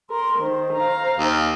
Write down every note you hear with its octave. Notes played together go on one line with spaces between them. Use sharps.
A#4 C6
D#3 C5
F5 A#5
D#2